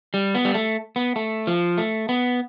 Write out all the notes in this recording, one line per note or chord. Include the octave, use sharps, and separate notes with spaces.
G3
B3
G3
A3
B3
A3
F3
A3
B3